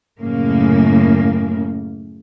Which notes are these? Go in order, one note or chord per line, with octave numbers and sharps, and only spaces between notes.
F#2 A2 C#3 A#3